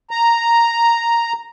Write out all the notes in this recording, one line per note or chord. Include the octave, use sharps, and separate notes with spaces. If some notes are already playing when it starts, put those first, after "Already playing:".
A#5